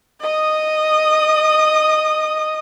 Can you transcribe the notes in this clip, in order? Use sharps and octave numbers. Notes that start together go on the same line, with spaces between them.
D#5 D#6